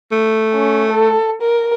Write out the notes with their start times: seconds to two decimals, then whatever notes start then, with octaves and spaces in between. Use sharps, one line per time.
0.12 A3
0.54 C#4
0.91 A4
1.41 A#4